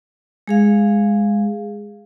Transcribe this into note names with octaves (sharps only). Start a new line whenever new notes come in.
G#3 G#4 F5